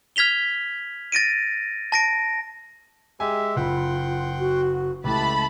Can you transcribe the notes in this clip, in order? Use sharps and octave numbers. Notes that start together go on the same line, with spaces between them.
F6 G#6 B6 F7 G7
A6 A#6 D7 D#7
A5 A#6 D7
G#3 G4 E5 G#5
F#1 F4 F#5 G5 B5 C6
F#4
C#2 E3 A3 G4 B4 A5 B5